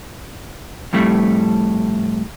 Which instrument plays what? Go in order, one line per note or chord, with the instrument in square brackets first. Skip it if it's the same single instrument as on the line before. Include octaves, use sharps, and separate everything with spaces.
[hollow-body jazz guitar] F2 A2 G3 A3